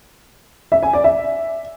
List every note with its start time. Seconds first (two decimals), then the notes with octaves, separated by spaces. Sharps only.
0.72 E5
0.83 G#5
0.93 D5
1.04 E5